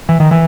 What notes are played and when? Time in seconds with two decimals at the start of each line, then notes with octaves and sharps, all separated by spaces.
0.09 E3
0.20 D#3
0.31 E3